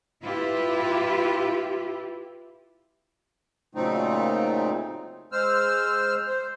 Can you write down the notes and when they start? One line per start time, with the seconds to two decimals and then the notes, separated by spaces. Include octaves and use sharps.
0.21 E4 F4 G4 B4
3.75 A#2 C#3 F#3 A3 C4 D#4
5.32 G#3 C5 E6 F6
6.27 C5